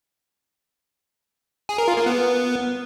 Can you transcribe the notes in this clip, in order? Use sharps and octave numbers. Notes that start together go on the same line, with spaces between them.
G#4
A#4
F4
A#3
B3